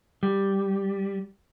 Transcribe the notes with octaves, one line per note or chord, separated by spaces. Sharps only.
G3